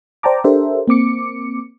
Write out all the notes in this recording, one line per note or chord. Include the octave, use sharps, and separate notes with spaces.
C5 D5 G5 A5 A#5 D6
D4 G4 A4 A#4 C5 E5
A#3 C4 D6 C#7